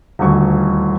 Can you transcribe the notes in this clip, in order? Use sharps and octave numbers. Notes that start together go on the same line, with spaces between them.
D#1 D2 C#6